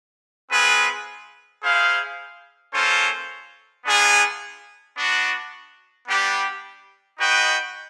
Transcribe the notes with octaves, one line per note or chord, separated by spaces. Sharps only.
G#3 C4 F4 G#4 B4
E4 G#4 C5 F5
A#3 C#4 F4 A4 C5
B3 D4 F4 G#4
B3 D4 F#4
G3 B3 D4 G4
D#4 F#4 B4 D#5 G5